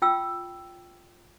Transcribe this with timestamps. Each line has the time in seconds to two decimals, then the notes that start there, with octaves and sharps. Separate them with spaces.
0.02 F4 G5 E6